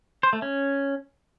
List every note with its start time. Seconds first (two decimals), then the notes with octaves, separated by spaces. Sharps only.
0.23 C5
0.33 A3
0.42 C#4